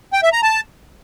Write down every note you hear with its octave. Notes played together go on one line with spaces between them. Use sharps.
G5
E5
A#5
A5